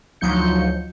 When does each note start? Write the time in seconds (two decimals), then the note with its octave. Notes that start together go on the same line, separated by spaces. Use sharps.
0.21 D2 F3 F#3 D#4 G6 C#7